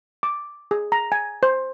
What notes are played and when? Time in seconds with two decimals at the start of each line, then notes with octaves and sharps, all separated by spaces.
0.23 D6
0.71 G#4
0.92 A#5
1.12 G#5
1.43 C5